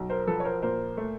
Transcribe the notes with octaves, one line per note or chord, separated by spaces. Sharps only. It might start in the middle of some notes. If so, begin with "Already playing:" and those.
Already playing: B1
A#4 C5
F3 A4 B4
C#5
A#4 C5
A#2 A#4 C5
A3